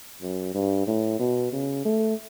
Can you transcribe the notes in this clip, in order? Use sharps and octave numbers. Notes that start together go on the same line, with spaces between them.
F#2
G2
A2
B2
C#3
A3